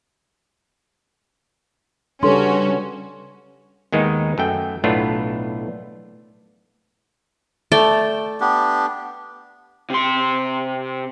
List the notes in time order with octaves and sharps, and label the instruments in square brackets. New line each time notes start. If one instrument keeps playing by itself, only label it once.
[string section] C#3 C#4 F#4 [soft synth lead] G3 [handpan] D4 A4 B4 [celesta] C6
[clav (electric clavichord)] D#2 D#3 G#3 B3 D#4
F#2 A3 G5
B1 A2 A3 B3 D4 F4
[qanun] A3 D5 G5
[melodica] B3 D4 G4
[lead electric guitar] C3 C6